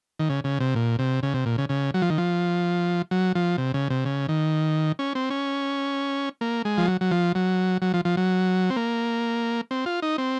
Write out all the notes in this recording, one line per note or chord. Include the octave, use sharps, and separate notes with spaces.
D#3
C#3
C#3
C3
A#2
C3
C#3
C3
A#2
C#3
C#3
F#3
F3
D#3
F3
F#3
F3
C3
C#3
C3
C#3
D#3
C#4
C4
C#4
A#3
G#3
F3
F#3
F#3
F3
F#3
F#3
F3
F3
F#3
C4
A#3
C4
F4
D#4
C4